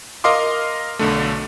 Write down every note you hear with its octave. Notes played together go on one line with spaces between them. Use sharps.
A#4 D#5 F5 C6 D6
B1 D3 A3